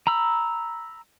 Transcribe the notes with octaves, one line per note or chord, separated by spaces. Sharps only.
A#5 B5 E6